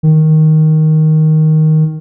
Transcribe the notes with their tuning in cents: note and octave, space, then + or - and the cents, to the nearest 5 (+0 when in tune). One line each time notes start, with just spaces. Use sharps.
D#3 +5